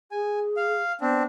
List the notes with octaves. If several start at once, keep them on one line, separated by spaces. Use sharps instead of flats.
G#4 G#5
F5
B3 C4 D4